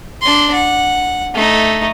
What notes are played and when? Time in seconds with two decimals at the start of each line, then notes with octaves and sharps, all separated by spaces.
0.21 D4 C6
0.54 F#5
1.35 A3 D#4